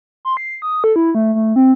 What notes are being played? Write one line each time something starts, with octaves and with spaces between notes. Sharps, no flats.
C6
C7
D#6
A4
E4
A3
A3
C4